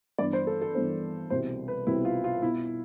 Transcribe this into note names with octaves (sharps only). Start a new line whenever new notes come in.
G2 E3 B3 D5
C5
A4
A4
G2 E3 B3 C5
C2 B2 G3 C4 C5
B4
C2 B2 G3 C4 E4
F4
F4
B2 B3 E4